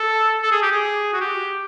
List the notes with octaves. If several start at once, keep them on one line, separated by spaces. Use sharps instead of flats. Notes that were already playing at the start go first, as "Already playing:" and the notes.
Already playing: A4
A4
G#4
G4
G#4
F#4
G4